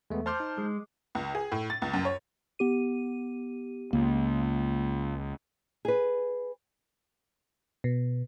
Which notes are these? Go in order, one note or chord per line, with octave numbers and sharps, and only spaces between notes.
E2 G#3 A3 B3
C5 A5 C6 D6 F6 G6
D#4
G#3
C#2
G#4
A2
A6
C#2
F#2
C#5
B3 G4 D#7
C#2 A#3
G#4 B4
B2